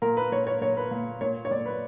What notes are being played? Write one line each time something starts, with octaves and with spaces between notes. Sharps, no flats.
A#2 A#4
B4
A#2 C#5
C#5
A#2 C#5
B4
A#2
A#2 C#5
C#5
A#2 D5
B4